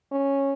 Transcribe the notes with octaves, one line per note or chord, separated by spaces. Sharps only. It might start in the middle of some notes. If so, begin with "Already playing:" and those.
C#4